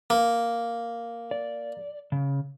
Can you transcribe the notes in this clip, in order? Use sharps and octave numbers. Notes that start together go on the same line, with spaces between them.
A#3
D5
C#3